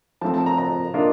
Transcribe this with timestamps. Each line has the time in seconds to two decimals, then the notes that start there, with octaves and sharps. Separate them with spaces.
0.21 F3 A3 C4 A5
0.34 A5
0.46 A#5
0.58 A#5
0.94 A#3 D4 F4 A#4 D#5